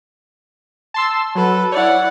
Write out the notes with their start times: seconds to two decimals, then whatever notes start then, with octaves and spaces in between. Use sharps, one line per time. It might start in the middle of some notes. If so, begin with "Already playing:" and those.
0.94 A5 C6 E6
1.35 F#3 A4 B4
1.72 E4 C#5 D5 F#5